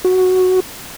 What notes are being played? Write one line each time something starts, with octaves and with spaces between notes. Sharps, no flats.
F#4